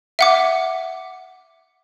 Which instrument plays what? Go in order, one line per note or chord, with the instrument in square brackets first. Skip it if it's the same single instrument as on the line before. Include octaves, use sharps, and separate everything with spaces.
[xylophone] E5 F#5 D6